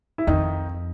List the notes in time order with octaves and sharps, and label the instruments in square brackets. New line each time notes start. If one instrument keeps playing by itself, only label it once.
[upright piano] E4
[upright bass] F2 [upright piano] D#3 D#4